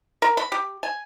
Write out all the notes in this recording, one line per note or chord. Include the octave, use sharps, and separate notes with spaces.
A#4
B5
G4
G#5